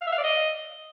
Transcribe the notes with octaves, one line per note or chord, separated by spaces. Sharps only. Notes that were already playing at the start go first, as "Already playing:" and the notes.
F5
E5
F5
D5
D#5